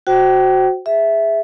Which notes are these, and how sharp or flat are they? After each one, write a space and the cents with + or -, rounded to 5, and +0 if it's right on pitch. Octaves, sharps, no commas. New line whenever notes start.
F#4 +0 C5 +0 G5 -35
G#4 -5 E5 +0